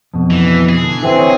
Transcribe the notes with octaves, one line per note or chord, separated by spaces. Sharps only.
F2 B2
E3
G#4
D3
E3 C4
C5 C#5